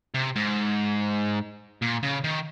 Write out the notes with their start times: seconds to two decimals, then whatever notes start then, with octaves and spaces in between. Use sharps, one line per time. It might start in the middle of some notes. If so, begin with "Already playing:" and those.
0.15 C3
0.36 G#2
1.82 A#2
2.03 C#3
2.24 D#3